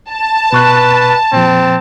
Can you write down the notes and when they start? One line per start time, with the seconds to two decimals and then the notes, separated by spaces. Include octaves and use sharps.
0.10 A5
0.53 B2 B4 C#6 F#6
1.33 A#2 F3 C4